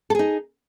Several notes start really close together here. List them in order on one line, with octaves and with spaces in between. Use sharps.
A4 G#4 D#4